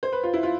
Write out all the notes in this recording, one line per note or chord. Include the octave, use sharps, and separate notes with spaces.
C5
B4
F4
E4
F4